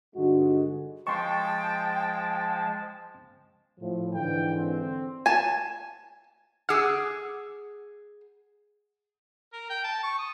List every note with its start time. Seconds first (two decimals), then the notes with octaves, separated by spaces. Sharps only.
0.15 G2 D3 G#3 D#4 F#4
1.07 F3 G#3 G5 A5 C6 C#6
3.80 A2 F3
4.14 G#2 D3 E3 G5
4.56 C4
5.26 G#5 A5
6.69 G#4 F#5 D6 E6
9.53 A#4
9.70 G5
9.84 A5
10.03 C#6
10.19 D#6